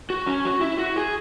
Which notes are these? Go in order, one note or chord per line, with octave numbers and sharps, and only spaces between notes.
F#4
C#4
F#4
E4
F#4
G#4